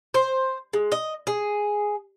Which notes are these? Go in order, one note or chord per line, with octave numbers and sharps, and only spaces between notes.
C5
G#3
D#5
G#4